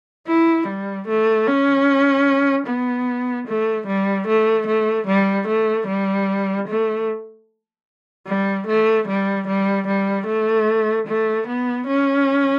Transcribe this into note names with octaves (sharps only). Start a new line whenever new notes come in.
E4
G3
A3
C#4
B3
A3
G3
A3
A3
G3
A3
G3
A3
G3
A3
G3
G3
G3
A3
A3
B3
C#4